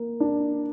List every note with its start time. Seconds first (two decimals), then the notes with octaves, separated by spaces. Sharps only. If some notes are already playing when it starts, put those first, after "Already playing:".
Already playing: A#3
0.20 D4